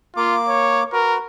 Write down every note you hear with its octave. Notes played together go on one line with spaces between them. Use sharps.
A#3 F4 D6
C#5
F#4 A#4 B4